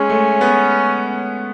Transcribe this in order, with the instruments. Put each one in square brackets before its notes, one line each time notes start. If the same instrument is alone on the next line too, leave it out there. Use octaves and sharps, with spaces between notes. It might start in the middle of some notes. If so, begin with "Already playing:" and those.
Already playing: [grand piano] G#3 [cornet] C#4
[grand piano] A3
B3